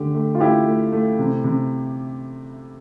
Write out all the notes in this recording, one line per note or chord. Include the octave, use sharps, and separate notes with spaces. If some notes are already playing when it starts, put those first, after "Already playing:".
Already playing: D3 A3 G4
A3
F4
A3 E4 G4
A3
A3
C3
C3